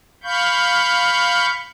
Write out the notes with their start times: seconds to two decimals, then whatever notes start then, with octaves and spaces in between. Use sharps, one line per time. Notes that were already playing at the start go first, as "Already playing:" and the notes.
0.24 F5 B5 C#6 G6